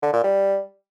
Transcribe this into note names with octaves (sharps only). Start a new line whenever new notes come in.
D3
A#2
G3